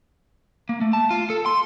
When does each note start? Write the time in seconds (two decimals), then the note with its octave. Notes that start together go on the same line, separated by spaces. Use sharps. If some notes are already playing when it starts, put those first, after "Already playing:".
0.69 A#3
0.81 A3
0.93 A5
1.11 F4
1.30 A4
1.46 C6